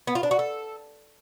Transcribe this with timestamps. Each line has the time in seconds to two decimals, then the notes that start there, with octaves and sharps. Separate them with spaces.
0.07 B3
0.15 F4
0.23 D4
0.31 F#4
0.39 A4